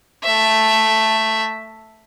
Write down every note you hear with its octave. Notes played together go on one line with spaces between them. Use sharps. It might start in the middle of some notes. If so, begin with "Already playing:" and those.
A3 E5